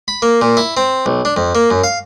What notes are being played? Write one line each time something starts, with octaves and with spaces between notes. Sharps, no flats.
B5
A#3
A#2
E4
C4
B1
D4
F2
A#3
F#2
F5